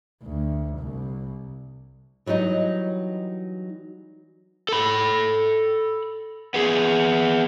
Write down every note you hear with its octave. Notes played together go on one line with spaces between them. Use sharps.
D2
C2
E3 F#3 G3 D#4 D#5
A4 B5
B3 G#4